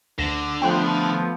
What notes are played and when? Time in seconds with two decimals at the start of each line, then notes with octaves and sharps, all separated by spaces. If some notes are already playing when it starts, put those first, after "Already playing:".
0.19 D2 D3 A#6 E7
0.62 F3 A3 B3 G5 C6 F#6